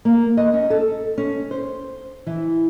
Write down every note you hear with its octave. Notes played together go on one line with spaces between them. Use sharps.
A#3
D#5
C#4
A4
C#4
C5
E3